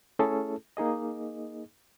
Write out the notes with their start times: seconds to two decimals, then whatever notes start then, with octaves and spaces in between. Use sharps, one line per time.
0.19 A3 C#4 E4 G#4 A4
0.77 A#3 D#4 G#4 D#5